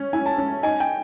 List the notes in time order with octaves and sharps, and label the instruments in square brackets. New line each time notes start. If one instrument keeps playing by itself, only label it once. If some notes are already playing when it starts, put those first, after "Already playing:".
Already playing: [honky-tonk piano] C#4
[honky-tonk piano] E4 [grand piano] G#5
[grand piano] A5
[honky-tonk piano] C#4
[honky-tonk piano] D#4 [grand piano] G#5
[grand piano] G5